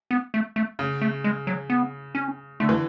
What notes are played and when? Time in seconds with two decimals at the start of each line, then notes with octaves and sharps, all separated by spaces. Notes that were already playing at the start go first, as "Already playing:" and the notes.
0.11 B3
0.34 A3
0.56 A3
0.79 C#3
1.01 A3
1.24 G#3
1.47 F#3
1.70 B3
2.15 C#4
2.60 D3 A3
2.69 E3